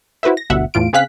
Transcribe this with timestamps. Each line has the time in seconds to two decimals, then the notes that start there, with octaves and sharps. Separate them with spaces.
0.23 E4 F#4 B4 C5 E5
0.37 A#6
0.50 G1 D2 B2 D3 E5 F#5
0.74 E2 A2 F4 D7
0.93 C#3 C4 G#4 F5 F#6 B6